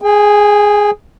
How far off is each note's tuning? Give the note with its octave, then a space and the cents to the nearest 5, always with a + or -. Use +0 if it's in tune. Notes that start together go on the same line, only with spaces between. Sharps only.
G#4 +0 G5 +40